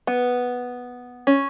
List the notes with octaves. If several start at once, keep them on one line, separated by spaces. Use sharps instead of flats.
B3
C#4